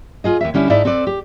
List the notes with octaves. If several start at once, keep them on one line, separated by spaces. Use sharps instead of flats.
F4 G#4 D#5
D#2 C#3 E5
D3 G3 C#4 E4
G#2 D#4 E4 D5 E5 A5
C4 A4 B4 D5
G4